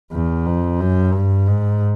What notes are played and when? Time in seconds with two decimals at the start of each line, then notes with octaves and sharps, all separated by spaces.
0.12 E2
0.46 F2
0.80 F#2
1.14 G2
1.48 G#2